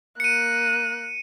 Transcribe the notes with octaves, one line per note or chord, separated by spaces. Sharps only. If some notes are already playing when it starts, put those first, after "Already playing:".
A#3 F#6 C#7 D#7